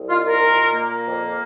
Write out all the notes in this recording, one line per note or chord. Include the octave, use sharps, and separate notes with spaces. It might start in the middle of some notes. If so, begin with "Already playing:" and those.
Already playing: C2
D#4 F4
F4 A#4
A#2
A#3
F2